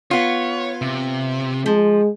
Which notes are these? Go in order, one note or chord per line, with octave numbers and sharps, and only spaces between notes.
B3 F4 C#5
C3
F3 G#3